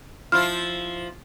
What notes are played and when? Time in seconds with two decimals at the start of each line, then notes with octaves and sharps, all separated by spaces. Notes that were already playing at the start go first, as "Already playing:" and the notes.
0.32 F3 E4 F4 F6